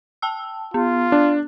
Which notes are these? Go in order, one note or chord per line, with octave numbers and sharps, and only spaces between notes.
G5 A5 E6
B3 F4
D4